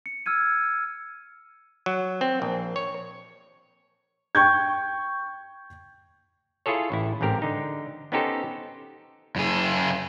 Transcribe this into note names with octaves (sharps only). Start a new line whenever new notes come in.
C#7
E6 F6 G#6 D#7
F#3
C4
A#1
C#5
G5 C#6 G6 G#6
E4 F4 G#4 A4 C#5
A1 E4
A1 G#2 C4 G4 A#4
D3 D#4
B3 C#4 D#4 G4 A4 C5
F#2 G#4